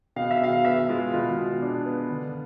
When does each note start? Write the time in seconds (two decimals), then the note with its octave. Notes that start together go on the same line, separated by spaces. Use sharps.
0.16 B2 F5
0.31 E5
0.41 B2 F5
0.65 B3 E5
0.89 G#3 F4
1.14 B2 F4
1.37 B2
1.62 D4
1.85 B3
2.10 D3